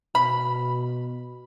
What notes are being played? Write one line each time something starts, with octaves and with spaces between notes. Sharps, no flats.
B2 B5